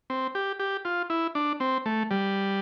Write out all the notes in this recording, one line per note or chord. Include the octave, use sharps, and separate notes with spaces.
C4
G4
G4
F4
E4
D4
C4
A3
G3